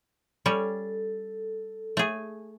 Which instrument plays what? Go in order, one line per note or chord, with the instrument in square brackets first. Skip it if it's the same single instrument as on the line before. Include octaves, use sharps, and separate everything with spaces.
[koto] G3 C#4 C#5 [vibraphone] A4
[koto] A3 G#4